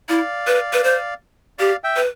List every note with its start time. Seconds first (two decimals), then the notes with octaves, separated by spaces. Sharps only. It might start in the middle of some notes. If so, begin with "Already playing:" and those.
0.09 E4 D5 F5
0.47 B4
0.73 B4
0.84 C5
1.59 G4 D5 F5
1.84 E5 G5
1.96 B4